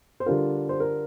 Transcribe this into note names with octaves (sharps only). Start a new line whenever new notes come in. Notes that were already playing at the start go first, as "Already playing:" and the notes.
C5
D3 G3 D4 F4 A#4
C5
A#4